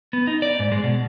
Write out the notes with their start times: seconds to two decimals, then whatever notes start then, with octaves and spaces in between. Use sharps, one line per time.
0.13 B3
0.27 D#4
0.42 D5
0.59 G#2
0.72 G#3
0.84 B2